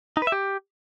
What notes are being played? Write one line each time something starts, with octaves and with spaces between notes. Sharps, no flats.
D#4
B4
E5
G4